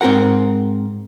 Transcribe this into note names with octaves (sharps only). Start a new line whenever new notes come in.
G#2 C4 G#4 A#4 F#5